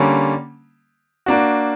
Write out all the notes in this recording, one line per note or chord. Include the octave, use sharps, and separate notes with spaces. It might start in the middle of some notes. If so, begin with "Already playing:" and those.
Already playing: D3 G3 A#3 C#4
A#3 D4 F#4